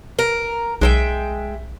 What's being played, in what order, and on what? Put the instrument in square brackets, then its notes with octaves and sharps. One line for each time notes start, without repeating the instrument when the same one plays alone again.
[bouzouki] A#4
[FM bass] B1 [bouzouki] G#3 E5 G5